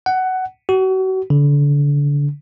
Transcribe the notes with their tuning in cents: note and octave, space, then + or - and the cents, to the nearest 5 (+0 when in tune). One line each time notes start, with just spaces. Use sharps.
F#5 +15
F#4 +35
D3 -30